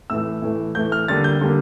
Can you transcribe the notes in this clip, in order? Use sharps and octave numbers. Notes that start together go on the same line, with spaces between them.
A2 E3 A3 E6
A2 E3 A3
A2 E3 A3 G6
F6
D3 G3 A#3 A6
G6
D3 G3 A#3